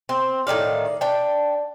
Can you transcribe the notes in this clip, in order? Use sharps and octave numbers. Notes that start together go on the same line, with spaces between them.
C4
A2 D#3 D5 F5
D4 G5